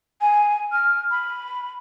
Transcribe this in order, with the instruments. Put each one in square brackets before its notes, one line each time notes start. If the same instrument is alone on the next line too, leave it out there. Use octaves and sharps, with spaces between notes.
[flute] G#5
F6
B5